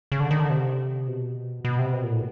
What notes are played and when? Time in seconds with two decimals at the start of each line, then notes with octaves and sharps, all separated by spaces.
0.12 C#3
0.20 D3
0.31 D#3
0.40 D3
0.50 C3
1.08 B2
1.65 B2
1.79 C3
1.93 B2
2.03 A#2
2.12 A2